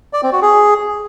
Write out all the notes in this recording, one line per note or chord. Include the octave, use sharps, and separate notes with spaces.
D5
C4
F#4
G#4